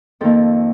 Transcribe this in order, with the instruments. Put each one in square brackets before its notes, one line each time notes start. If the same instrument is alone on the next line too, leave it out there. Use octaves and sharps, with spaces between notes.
[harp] F2 D#3 A#3 A4